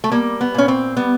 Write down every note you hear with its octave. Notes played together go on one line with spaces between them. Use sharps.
A3
G3 A#3
B3
A#2 C#4
C4
G3 B3